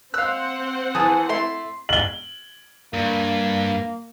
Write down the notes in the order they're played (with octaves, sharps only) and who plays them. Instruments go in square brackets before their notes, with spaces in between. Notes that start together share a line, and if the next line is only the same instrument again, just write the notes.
[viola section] C4 C5 F#5 [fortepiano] F5 E6 [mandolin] F#6
[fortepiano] E3 [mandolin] G#4 A5
[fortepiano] A3 E4 [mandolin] C6
[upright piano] F#7 G7
[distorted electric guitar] G2 [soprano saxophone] A#3